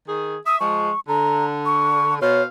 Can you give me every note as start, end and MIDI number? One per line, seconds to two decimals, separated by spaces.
0.08 0.36 51
0.08 0.36 68
0.46 0.57 76
0.46 0.59 87
0.60 0.91 53
0.60 0.91 56
0.60 1.00 85
1.09 2.19 50
1.09 1.45 82
1.66 2.15 85
2.21 2.45 47
2.21 2.45 72
2.21 2.42 73
2.21 2.45 77